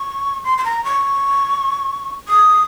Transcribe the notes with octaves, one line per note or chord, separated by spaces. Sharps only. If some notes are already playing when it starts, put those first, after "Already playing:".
Already playing: C#6
C6
C6
A#5
C#6
D#6